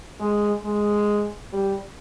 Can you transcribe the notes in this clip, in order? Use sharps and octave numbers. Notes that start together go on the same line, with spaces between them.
G#3
G#3
G3